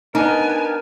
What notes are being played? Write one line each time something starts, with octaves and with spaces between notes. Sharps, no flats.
B3 D4 D#4 A#4 G#5